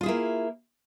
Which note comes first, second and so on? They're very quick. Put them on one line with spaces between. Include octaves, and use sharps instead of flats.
F4 G#4 E4 A#3